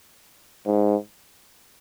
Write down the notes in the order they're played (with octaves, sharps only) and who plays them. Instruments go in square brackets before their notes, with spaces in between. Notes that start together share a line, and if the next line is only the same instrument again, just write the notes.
[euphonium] G#2